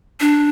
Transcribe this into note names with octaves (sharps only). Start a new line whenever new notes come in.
D4